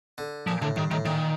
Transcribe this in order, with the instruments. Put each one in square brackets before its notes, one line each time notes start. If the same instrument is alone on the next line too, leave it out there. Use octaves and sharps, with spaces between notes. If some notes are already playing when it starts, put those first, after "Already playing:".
[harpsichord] D3
[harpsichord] A#2 [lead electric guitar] F3
[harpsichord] A2 [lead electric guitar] D3
[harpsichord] G2 [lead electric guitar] D#3
[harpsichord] A2 [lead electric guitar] D#3
[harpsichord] A#2 [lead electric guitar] D#3